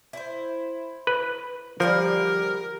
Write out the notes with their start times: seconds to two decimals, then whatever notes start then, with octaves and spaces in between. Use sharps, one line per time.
0.13 E4 C5
1.07 B4
1.80 D3 F3 G3 G#4 A#4